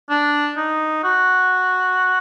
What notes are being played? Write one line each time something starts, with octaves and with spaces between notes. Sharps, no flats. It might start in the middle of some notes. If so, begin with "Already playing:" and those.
D4
D#4
F#4